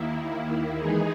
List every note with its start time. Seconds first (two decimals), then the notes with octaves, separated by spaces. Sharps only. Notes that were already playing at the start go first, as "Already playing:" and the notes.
Already playing: D#2 D#3 A#3 E4
0.79 E3 G#3 D#4 G#4